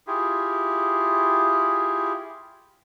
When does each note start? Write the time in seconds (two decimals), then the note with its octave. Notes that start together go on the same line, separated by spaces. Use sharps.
0.07 E4 F4 G4 G#4